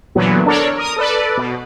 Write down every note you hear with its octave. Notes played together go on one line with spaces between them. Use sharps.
A#2 D3 E3 F#3 B3
D4 A4 A#4 C#5 D5
A#4 D#6
A4 B4 D5
B2